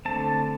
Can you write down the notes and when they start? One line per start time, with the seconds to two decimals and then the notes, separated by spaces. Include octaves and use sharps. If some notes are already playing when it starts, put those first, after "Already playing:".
0.05 D3 A3 C4 A5